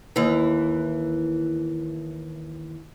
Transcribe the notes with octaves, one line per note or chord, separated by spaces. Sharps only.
D#2 E3